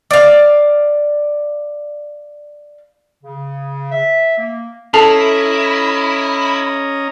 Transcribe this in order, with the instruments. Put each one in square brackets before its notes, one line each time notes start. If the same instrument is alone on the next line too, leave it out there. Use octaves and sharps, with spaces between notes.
[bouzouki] D5 F5
[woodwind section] C#3
E5
A#3
[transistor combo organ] C#4 D#5 A#5 [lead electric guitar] E4 [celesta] A4 C7 F7 [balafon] A5